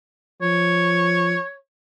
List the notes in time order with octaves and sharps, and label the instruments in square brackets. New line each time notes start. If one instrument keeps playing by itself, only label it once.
[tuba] F3 [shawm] C#5